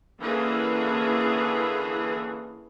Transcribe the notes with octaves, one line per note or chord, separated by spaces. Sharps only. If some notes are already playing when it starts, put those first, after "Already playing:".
D3 E3 A#3 C#4 G#4